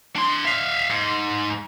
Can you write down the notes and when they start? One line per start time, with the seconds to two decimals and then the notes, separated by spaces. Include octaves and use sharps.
0.16 D4 C6
0.46 E5 F5
0.90 G#2